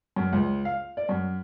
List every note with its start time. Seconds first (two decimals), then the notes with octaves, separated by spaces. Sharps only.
0.16 F#2
0.33 C#2
0.65 F5
0.97 D5
1.09 F#2